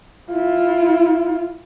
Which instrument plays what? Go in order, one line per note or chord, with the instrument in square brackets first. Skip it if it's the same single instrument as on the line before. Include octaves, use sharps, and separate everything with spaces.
[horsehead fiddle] E4 F4